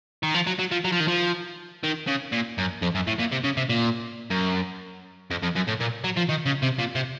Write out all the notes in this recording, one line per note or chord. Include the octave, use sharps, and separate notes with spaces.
D#3
F3
F#3
F#3
F3
F#3
F3
D#3
F3
D#3
C#3
A#2
F#2
F2
F#2
A2
A#2
C3
C#3
C3
A#2
F#2
F2
F2
F#2
A2
A#2
F#3
F3
D#3
C#3
C3
A#2
C3